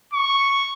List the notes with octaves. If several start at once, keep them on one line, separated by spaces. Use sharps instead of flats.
C#6